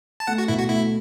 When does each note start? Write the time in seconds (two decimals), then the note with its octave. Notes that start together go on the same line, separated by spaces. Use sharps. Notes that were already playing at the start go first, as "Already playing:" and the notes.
0.20 A5
0.27 A3 F#5
0.38 F#4
0.48 B2 E4
0.59 F#4
0.69 A3 E4